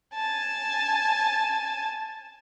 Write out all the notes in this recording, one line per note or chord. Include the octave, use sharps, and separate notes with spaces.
G#5 A5